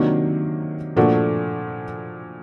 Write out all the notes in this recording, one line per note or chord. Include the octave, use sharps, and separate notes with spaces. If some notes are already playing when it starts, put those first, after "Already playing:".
Already playing: C3 D#3 F#3 A#3 D4
A#2 F3 A3 D4 F#4